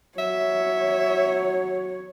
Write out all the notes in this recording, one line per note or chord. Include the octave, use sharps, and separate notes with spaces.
F#3 C#5 E5